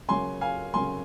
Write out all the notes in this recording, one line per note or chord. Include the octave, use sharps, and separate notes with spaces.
C#3 F#3 A#3 G#5 C6
F5 G#5
C#3 F#3 A#3 G#5 C6